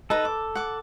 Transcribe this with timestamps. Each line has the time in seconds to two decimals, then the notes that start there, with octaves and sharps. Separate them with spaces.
0.10 D#4 A4 B4 A#5
0.25 D6
0.55 F#5 D6